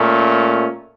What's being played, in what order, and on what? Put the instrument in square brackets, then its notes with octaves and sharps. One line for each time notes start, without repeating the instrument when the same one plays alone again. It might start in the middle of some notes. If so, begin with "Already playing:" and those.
Already playing: [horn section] A#2 A3 C#4